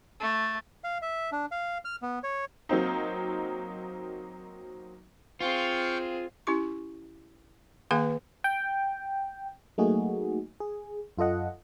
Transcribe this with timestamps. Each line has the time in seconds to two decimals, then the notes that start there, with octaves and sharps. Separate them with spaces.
0.20 A3
0.84 F5
1.02 E5
1.32 D4
1.52 F5
1.85 F6
2.02 B3
2.23 C#5
2.69 F#3 A#3 C4 D#4
5.40 C4 F4 G#4 F5 G5 C#6
6.47 C#4 E4 G4 C#6
7.91 D#3 A#3 G#4 B4 F5 G#5
8.44 G5
9.78 F#3 A3 A#3 D#4 F#4 G#4
10.60 G#4
11.18 F#2 F4 A4 D#5 F#5